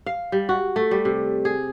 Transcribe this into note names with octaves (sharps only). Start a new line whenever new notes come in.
F5
G3
F#4
A3
G3
C3
G#4